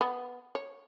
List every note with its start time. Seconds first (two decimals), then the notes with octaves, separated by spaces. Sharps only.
0.01 B3
0.55 C#5